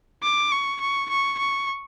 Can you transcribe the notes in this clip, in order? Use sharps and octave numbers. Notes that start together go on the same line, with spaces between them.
D6
C#6
C#6
C#6
C#6